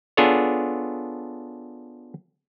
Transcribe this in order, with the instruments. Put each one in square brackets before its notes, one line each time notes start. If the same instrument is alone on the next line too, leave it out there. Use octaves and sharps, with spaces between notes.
[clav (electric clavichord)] B3 D4 F4 G#4 A4 C#5